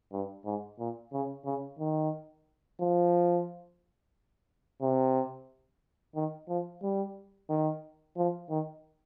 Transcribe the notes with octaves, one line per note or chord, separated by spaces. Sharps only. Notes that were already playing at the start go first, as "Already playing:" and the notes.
G2
G#2
A#2
C#3
C#3
D#3
F3
C3
D#3
F3
G3
D#3
F3
D#3